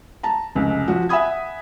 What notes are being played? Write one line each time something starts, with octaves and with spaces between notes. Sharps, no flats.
A5 A#5
F1 C#2
F3 F#4
E5 F#5 G#5 B5 D#6 G#6